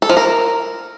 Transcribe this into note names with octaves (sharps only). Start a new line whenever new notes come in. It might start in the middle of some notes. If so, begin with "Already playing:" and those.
A4
F3
A#4